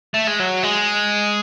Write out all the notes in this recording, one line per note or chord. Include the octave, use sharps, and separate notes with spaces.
A3
G#3
F#3
G#3